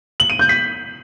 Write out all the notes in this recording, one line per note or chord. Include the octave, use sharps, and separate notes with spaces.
F#7
D#7
G6
B6